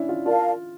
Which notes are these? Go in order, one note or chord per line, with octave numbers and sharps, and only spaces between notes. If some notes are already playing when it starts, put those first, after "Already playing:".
Already playing: C#4 D4 E4
F4
F4 A#4 D5 F5 A5